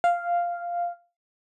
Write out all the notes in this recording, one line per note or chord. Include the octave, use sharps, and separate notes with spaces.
F5